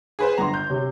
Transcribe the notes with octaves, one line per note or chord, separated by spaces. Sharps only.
G#4 B4 C5
G1 A#5 C6
G6
C3 C#5